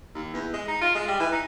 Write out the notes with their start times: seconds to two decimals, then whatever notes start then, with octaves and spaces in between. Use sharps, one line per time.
0.15 D#2
0.33 E2
0.53 G#3
0.68 D#4
0.82 F4
0.95 G#3
1.08 G3
1.20 E3
1.32 D#4